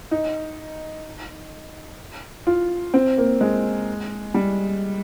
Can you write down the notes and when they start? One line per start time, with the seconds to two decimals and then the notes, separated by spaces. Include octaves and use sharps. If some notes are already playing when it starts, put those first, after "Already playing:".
0.11 D#4
2.47 F4
2.94 C4
3.18 A#3
3.41 G#3
4.34 G3